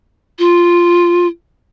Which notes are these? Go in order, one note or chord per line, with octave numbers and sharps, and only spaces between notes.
F4